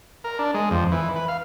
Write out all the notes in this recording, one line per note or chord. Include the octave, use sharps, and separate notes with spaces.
A#4
D4
G#3
F2
E3
B4
F5